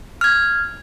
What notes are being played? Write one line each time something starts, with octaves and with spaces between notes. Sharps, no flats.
F6 G#6